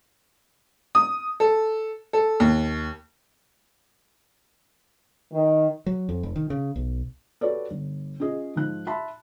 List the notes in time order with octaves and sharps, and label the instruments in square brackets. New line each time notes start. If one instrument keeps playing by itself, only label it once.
[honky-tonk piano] D#6
A4
A4
D#2
[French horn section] D#3
[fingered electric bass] F#3
F2
F1
D#3
C#3
B1
[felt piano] F#4 G4 A4 B4 C#5 D5
G1
C#4 F4 G#4 D#5
G#2 F3 F#6
E5 A5 B5 C6